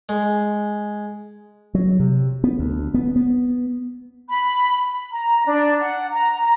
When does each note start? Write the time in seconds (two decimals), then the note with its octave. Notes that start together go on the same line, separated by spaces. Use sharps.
0.09 G#3
1.75 F#3
2.00 C3
2.44 B3
2.59 D2
2.94 B3
3.16 B3
4.29 B5
5.12 A#5
5.46 D4
5.80 F#5
6.10 A#5